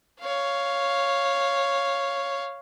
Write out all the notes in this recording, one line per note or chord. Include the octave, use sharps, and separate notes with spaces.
C#5 F5